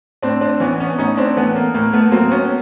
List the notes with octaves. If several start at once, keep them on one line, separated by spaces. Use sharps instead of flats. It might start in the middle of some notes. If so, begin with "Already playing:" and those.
A2 C4 D4
C4 D4
E3 B3 C#4
B3 C#4
A2 C#4 D#4
C4 D4
E3 A3 B3
A#3
A2 A#3
A3 B3
F#3 A#3 C4
B3 C#4